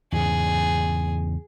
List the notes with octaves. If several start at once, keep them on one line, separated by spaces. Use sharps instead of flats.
E2 G#2 C#3 G#4